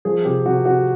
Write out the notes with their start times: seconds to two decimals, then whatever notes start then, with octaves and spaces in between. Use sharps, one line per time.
0.05 F3 G#4
0.25 C3 G4
0.46 C3 F#4
0.65 C3 F#4